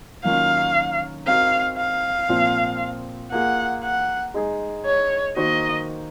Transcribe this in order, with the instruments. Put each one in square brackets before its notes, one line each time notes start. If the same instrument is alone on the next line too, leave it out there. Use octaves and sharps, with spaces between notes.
[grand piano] D#3 F#3 A#3 C#4 F4 [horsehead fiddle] F5
[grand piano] C4 D#4 F#4 A#4 [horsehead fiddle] F5
[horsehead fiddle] F5
[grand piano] A#2 F3 C4 F4
[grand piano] A#3 F4 G#4 [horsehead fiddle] F#5
[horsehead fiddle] F#5
[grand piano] G#3 D#4 G#4
[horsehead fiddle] C#5
[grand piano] D#3 A#3 D#4 F#4 C5 [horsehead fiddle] D#5